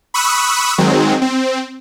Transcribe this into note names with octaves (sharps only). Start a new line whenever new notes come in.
B5 C#6 D#6 E6 F#6
D#3 F#3 G#3 C4
C4